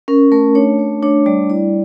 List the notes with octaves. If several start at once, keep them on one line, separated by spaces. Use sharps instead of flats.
C#4 A#4
A3 A#4
D4 C#5
A3
D4 C#5
G3 D5
E4 D5